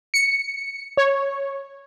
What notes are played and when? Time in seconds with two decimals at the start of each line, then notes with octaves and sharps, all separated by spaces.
0.14 C#7
0.97 C#5